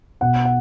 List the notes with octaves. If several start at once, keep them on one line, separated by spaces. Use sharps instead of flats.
B2 F#5
F#5